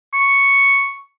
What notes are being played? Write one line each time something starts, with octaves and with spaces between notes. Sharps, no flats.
C#6